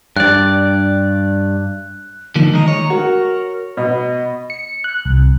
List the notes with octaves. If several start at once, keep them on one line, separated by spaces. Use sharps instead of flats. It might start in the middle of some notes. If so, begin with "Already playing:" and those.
G2 D5 F#6
D3 F3 A#3 D#4
D#3 G#3 D#5 A#5
C#5
F#4 A#4
B2 D#5
C#7
F#6
C2